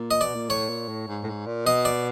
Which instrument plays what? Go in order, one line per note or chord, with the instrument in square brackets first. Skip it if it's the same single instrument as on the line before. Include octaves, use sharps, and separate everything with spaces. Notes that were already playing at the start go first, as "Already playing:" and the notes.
Already playing: [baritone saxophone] A#2
[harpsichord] D#5
[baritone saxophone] B2 [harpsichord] D5
[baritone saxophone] A#2
[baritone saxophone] A2 [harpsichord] C#5
[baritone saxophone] A#2
A2
G#2
A2
G#2
A#2
[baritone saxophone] B2 [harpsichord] D#5
[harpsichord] D5